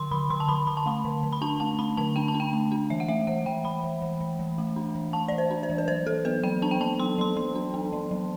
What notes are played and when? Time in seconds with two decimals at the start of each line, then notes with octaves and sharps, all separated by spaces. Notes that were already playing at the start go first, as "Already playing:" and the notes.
Already playing: D3 C6
0.11 D3 B5
0.30 D3 C6
0.40 A5
0.49 D3 B5
0.67 D3 B5
0.77 A5
0.86 A3 B5
1.05 D3
1.23 D3
1.33 B5
1.41 D4 A5
1.60 A3 A5
1.79 A3 B5
1.97 D3 A5
2.16 D4 G5
2.28 A5
2.34 D4
2.40 G5
2.53 A3
2.72 D4
2.90 E3 E5
3.00 F#5
3.08 A3 E5
3.27 E3 F#5
3.46 E3 G5
3.64 E3 B5
3.84 E3
4.02 E3
4.21 E3
4.39 E3
4.58 A3
4.76 D4
4.95 E3
5.13 A3 A5
5.28 E3 D5
5.38 C5
5.50 D4
5.63 C5
5.70 E3
5.78 B4
5.88 F#3 C5
6.06 F#3 A4
6.25 B3 B4
6.44 F#3 G5
6.62 D4 A5
6.71 G5
6.81 F#3 A5
6.99 B3 C6
7.18 F#3 C6
7.36 F#3 C6
7.55 D4
7.74 B3
7.92 F#3
8.11 F#3